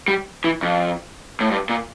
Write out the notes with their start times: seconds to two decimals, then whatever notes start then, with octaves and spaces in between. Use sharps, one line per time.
0.08 G3
0.44 E3
0.63 F2
1.40 A2
1.51 G2
1.69 A#2